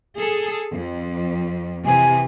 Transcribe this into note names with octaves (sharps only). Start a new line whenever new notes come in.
G#4 A4
F2
C3 E3 G#5